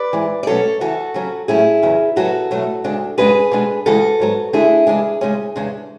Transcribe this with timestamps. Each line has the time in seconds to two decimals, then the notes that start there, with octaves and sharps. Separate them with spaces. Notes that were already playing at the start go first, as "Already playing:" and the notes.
Already playing: B4 D5
0.13 G#2 E3 G#3
0.43 D5
0.47 B2 F#3 A3 C#4 A4 C#5
0.80 E2 C#3 E3 F#4 A4
1.14 C#3 F#3 C#4
1.48 A2 F#3 A3 C#4 E4 G#4
1.83 E2 C#3 F#3
2.16 C#3 F#3 B3 F#4 A4
2.51 B2 F#3 A3
2.84 D2 C#3 G#3 D4
3.18 F#2 C#3 G#3 B3 D4 G#4 B4
3.52 B2 G#3 D4
3.86 D2 C#3 E3 G#3 F#4 A4
4.20 G#2 F#3 B3
4.53 E2 D3 A3 D4 E4 G#4
4.87 C#3 E3 G#3 D4
5.21 C#3 G#3 C#4
5.56 E2 C#3 G#3 D4